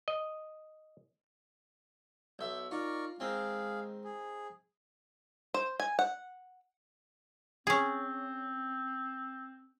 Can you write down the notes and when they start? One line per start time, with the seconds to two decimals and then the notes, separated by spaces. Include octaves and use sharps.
0.08 D#5
2.39 B1 E5 G6
2.71 D#4 F4 A#4 D5 C#6
3.20 D#3 G#3 C4 G#4 F5
4.04 G#4
5.54 C5
5.80 G#5
5.99 F#5
7.67 C4 C#4 G#4